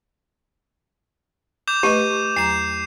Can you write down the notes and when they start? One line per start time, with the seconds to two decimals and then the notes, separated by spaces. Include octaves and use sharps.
1.68 D6 G6 E7
1.83 A3 G4 B4 D#5 D#7
2.36 E2 F#3 A#5 C7 E7